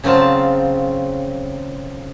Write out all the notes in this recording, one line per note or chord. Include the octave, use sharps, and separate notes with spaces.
C#3 F#3 C4 F4 A5